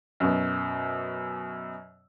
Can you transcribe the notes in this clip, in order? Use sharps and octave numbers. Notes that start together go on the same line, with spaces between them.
F#2 B2